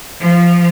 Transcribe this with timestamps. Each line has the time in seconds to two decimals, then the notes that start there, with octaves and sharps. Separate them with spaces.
0.20 F3